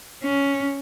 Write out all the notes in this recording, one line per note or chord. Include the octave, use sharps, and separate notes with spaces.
C#4